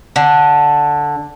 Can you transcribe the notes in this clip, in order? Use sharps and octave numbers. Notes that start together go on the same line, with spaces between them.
D3